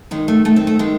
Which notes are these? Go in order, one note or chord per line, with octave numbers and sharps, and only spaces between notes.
D#3 G#3
A3
D#3 A3
C4
A3
D#3 G#3